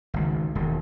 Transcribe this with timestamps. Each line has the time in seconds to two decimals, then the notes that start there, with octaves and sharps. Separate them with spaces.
0.14 G#1 C#2
0.55 E1 D#2